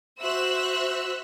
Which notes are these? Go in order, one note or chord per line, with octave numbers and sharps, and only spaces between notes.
F#4 C5 E5 E6 F#6